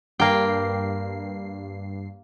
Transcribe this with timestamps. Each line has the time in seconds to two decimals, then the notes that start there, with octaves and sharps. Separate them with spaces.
0.20 G2 A#3 G5 C7